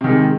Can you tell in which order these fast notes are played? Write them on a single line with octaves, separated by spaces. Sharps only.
C3 D#3 G#3